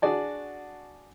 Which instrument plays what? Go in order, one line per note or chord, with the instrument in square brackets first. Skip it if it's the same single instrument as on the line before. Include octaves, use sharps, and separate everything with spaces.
[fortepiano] D4 F#4 G#4 D5 A5